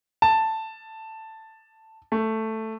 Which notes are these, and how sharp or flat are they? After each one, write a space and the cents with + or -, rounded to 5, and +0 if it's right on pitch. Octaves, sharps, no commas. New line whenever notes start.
A5 +5
A3 +5